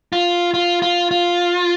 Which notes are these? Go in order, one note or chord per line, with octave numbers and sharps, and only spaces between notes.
F4
F4
F4
F4